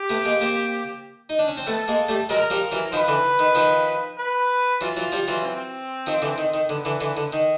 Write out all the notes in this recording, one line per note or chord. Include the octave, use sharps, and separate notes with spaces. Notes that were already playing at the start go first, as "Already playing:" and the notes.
Already playing: G4
A3 B3
G#3 A#3
A#3 C4
D#4
D4
C#4
C4
A3 B3 A4
G#3 A#3
G3 A3
F#3 G#3 A#4
F3 G3
E3 F#3
D#3 F3 B4
D3 E3
D#3
D#3 F3
B4
E3 F#3 F4
E3 F#3
F3 G3
E3 F#3
C4
D#3 F3
D3 E3
D#3
D#3
D3 B3
D3 E3
D3 E3
D3
D#3